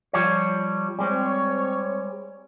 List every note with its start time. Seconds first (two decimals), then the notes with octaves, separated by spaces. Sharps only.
0.13 F3 G3 C#5
0.99 G3 G#3 C4 C#5